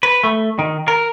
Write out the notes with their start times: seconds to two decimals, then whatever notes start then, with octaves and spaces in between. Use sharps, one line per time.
0.03 B4
0.24 A3
0.59 D#3
0.88 A#4